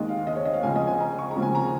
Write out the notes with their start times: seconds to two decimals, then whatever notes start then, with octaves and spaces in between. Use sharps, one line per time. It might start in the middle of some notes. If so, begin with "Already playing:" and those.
Already playing: D#2 D#3 G#3 D#5
0.09 F5
0.27 D#5
0.36 C#5
0.45 D#5
0.54 F5
0.63 C#2 C#3 F3 G#3 G#5
0.76 D#5
0.87 G#5
1.00 A#5
1.18 C#6
1.31 A#5
1.36 D#2 C#3 F3 G#3
1.42 G#5
1.55 A#5